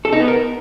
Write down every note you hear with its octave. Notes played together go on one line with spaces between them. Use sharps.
A4
D#4
B3
A#4